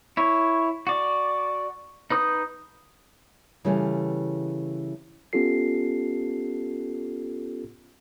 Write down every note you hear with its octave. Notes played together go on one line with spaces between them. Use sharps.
E4 C#5
F#4 D5
D#4 B4 D#6 G6
C#3 E3 G3 A3
B3 C#4 F4 G4 A4 C7